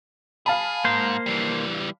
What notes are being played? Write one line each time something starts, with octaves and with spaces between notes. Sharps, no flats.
G#4 F5 A5 B5
G#2 A#3 C5
E3 G3